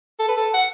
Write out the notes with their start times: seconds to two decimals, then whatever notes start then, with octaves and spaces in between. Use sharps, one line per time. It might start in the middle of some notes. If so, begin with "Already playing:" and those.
0.19 A4
0.28 B4
0.37 A4
0.54 F#5